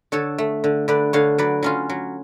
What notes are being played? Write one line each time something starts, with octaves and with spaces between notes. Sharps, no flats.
D3 A4 C#5
A3
D3
D3 B4 D5
D3 C#5 F5
F#3 B4 D5
F#3 C#4 F4
F#3